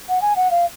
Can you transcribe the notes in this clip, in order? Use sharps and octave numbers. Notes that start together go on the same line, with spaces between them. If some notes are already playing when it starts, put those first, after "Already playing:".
F#5
G#5
F#5
F5